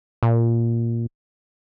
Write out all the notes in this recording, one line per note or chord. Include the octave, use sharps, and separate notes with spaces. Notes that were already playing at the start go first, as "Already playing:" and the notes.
A#2